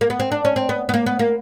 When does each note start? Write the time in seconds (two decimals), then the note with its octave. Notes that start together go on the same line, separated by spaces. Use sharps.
0.01 A#3
0.10 B3
0.20 C4
0.32 D4
0.45 C#4
0.56 C4
0.69 B3
0.89 B3
0.94 A#3
1.06 B3
1.19 A#3